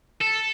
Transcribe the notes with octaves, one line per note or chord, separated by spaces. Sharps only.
A4